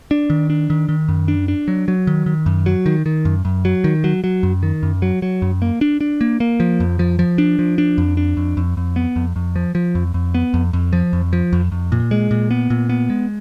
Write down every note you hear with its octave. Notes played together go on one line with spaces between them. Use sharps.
D4
D#3
D4
D#3
D#3
F#2
D4
D4
F#3
F#3
D#3
D#3
F#2
F#3
D#3
D#3
F#2
F#2
F#3
D#3
F#3
F#3
F#2
D#3
F#2
F#3
F#3
F#2
A#3
D4
D4
A#3
A#3
F3
F2
F3
F3
D4
F3
D4
F2
D4
F2
F2
F2
B3
F2
F2
F3
F3
F2
F2
B3
F2
F2
F3
F2
F3
F2
F2
A#2
G#3
A#2
B3
A#2
B3
G#3